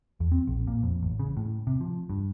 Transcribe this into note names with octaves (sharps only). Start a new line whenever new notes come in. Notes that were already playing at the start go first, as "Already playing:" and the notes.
E2
C4
A#1
A#2
F2
A1
C#3
A2
C3
F3
G2